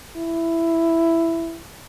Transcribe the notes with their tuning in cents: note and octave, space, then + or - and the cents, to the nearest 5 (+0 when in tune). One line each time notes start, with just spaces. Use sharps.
E4 +10